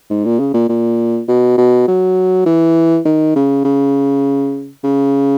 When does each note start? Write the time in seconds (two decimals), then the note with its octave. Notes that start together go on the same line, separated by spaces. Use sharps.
0.10 G#2
0.25 A#2
0.40 C#3
0.54 A#2
0.69 A#2
1.28 B2
1.58 B2
1.88 F#3
2.46 E3
3.05 D#3
3.36 C#3
3.64 C#3
4.84 C#3